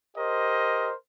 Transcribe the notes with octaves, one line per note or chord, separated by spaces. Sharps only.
G4 A#4 C5 D#5